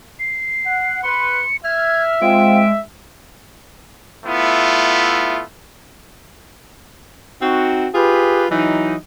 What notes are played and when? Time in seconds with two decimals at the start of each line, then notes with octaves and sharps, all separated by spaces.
0.19 C7
0.65 F#5
1.03 B4 C6 C#7
1.64 E5 F6 G#6
2.22 G#3 C4 F4 D7
4.26 A3 B3 E4 F4
7.42 C4 D#4 F#4
7.94 F4 G4 G#4 B4
8.52 E3 F#3 D#4